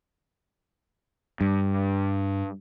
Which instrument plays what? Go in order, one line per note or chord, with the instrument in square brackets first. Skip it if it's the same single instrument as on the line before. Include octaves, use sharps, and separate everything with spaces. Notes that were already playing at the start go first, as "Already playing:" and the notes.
[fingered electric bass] G2